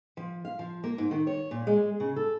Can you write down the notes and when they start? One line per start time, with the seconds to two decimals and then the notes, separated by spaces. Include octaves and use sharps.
0.17 F3
0.45 F5
0.59 F3
0.84 A#3
0.98 G#2
1.11 D#3
1.27 C#5
1.51 A#2
1.67 G#3
2.00 C#3
2.16 A4